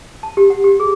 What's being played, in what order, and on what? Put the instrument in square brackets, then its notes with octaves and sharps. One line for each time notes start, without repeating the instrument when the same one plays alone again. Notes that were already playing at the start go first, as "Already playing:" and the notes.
[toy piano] A5
G4
F#5
G4
G#4